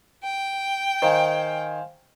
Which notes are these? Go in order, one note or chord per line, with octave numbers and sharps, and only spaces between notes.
G5
D#3 C5 F5 G#5